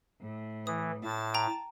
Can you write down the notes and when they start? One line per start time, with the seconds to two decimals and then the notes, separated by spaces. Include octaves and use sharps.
0.20 A2
0.67 E3 D#6
1.04 A2 A5 A6
1.34 G5 A#5